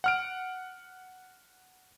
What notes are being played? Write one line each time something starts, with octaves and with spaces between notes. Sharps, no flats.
F#5 F6 D7